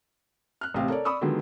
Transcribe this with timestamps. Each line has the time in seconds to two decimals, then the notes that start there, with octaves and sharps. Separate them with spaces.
0.61 F6 F#6
0.74 A1 C3 C4 F5
0.88 A4 A#4 C#5 D5
1.05 D5 B5 C#6 D#6 E6
1.21 D3 D#3 F#3 G#3 B3 F4